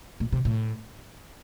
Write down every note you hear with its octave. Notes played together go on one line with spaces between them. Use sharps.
A#2
C3
A2